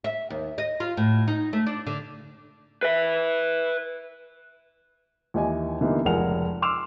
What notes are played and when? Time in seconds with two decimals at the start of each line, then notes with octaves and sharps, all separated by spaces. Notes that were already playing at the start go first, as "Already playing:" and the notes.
0.04 E5
0.30 D#2
0.58 D#5
0.80 F4
0.97 A2
1.28 D#4
1.53 A3
1.66 D4
1.87 D3
2.83 B4 E5
5.34 D#2 E3 G4 D#5 G#5
5.81 D3 E3 G3 A#3 B3 D#4
6.05 F1 C#2 G#4 A#4 F#5 F7
6.62 C6 D6 E6 F6 E7 F7